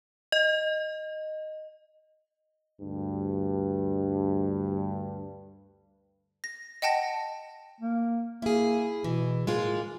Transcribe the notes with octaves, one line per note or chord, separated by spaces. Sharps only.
D#5
D2 G2
A#6
D#5 F#5 G5 A5 A#6
A#3
A#3 E4 G#4
B2 E3
A2 G#3 A#3 F4